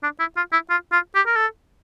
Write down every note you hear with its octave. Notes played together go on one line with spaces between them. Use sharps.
D4
E4
F4
E4
F4
F4
G4
A#4
A4